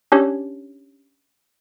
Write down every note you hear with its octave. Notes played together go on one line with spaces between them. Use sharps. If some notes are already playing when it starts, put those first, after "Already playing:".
C#4 D4 G4 C#5